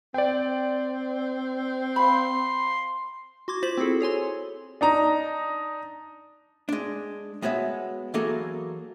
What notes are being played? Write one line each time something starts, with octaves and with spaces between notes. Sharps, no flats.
C4 D5 G5
F5 B5 C6
F#4 C6 D6 G#6
F4 C5 D6 B6 F#7
C4 E4 F#4 G#4 A4
G#4 C#5 G#5 C6
D4 D#4 A#5
G#3 D4
G#3 B3 F#4 C#5 E5
E3 F#3 A#3 G#4 A4